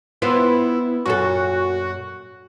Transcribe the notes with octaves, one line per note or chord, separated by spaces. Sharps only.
B3 C4 E4 F4
F#2 A#2 F#4 A4